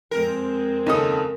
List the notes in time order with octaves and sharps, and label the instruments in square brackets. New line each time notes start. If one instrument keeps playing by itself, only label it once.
[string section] F2 G#3 C4 [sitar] A#4
[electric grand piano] D#2 C#3 D#6 [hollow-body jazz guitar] D#4 A4